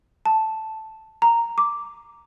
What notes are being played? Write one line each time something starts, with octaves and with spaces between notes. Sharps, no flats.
A5
A#5
D6